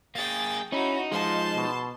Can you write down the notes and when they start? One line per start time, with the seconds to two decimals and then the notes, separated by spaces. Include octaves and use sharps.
0.15 A#3 G#4 G5 A6
0.72 C#4 D#4 E4 F#4
1.12 F3 G#3 F4 A5 C6
1.56 B2